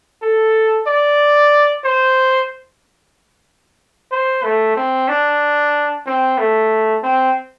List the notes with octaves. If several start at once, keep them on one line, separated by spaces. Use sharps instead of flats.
A4
D5
C5
C5
A3
C4
D4
C4
A3
C4